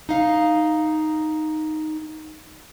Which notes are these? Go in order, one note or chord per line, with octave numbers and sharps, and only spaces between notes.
D#4 F5